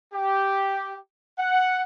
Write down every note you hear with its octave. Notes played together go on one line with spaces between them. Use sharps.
G4
F#5